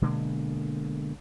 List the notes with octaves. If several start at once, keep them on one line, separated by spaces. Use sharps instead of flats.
B2 D3 G#3 A#3